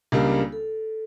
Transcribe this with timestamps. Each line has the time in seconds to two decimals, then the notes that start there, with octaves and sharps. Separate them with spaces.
0.12 C#2 C#3 G3 A#3 D4
0.52 A4